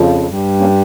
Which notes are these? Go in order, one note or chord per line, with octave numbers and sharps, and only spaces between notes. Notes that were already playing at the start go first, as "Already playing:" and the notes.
Already playing: F2 C#3 F3
G2 G3
A#3 C#4